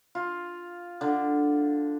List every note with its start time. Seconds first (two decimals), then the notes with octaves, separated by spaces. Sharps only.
0.15 F4
1.01 D3